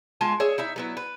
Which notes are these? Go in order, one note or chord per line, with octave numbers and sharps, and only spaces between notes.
G#3 F4 G#5 A5
G#4 C#5 E5
D#4 E4 E5
F#3 B3 E4
B4